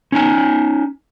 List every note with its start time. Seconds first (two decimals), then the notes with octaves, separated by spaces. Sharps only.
0.12 C#4 D#4 G#5